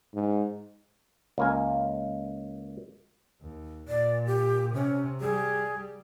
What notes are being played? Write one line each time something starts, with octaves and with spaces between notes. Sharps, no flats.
G#2
C#2 A#3 G#5
D#2
A#2 D5
G4
C3 C#4
G3 G#4